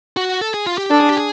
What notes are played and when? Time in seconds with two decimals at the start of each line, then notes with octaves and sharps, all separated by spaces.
0.17 F#4
0.41 A4
0.54 G#4
0.67 F4
0.78 G4
0.91 D4 A4
1.00 G#4
1.09 G4
1.17 G#4